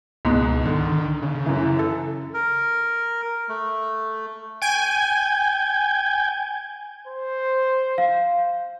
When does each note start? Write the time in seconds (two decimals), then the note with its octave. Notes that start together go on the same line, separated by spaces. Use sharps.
0.25 C#2 G#2 B2
0.65 D3 D#3
1.22 C#3
1.46 F#2 E3
1.79 A4
2.34 A#4
3.49 A3
4.62 G5 G#5 G6 G#6
7.08 C5
7.98 F5